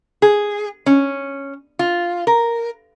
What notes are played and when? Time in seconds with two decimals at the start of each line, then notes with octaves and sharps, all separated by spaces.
0.22 G#4
0.86 C#4
1.79 F4
2.27 A#4